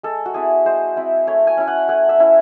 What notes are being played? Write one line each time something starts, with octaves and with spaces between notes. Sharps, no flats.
G#3 A4
F#4
C4 E4 G#4
G#3 C5
C4 E4
A3 C#5
G#5
C#4 E4
F#5
A3 F#5
E5
C#4 E4